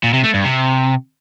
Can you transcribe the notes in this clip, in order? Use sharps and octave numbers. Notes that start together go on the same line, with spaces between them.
A#2
C3
A3
G2
C3